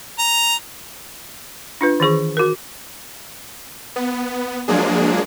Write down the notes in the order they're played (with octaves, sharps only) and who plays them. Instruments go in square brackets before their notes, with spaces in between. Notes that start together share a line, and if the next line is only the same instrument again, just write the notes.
[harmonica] A#5
[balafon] D4 F4 B4
D#3 E3 G#4 C#6
F#4 A#4
[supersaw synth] B3
F3 F#3 G#3 A#3 D4 G#4